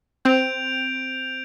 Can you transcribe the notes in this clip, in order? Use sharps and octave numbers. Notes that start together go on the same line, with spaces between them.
C4 G6 D7 F7